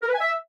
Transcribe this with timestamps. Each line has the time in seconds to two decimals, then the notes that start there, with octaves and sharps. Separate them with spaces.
0.03 A#4
0.09 B4
0.15 G#5
0.20 E5